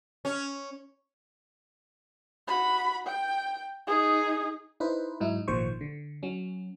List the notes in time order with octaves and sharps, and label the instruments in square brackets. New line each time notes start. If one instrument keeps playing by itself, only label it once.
[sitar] C#4
[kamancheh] F#4 B5
G5
D#4 G#4
[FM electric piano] D#4 E4 B4 C5
G#2 F#3 D#4 E4
G#1 A#2 D#3 F3 C5 C#6
D3
F#3 C#4